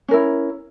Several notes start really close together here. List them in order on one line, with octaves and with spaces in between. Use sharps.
C#4 A#4 E4